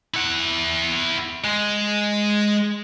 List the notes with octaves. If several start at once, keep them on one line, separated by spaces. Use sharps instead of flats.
E4 F#5
G#3